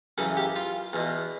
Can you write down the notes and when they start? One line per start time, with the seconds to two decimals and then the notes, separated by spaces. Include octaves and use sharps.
0.18 F#2 C#3 E3 A4
0.37 G4
0.56 F4
0.93 E2 B2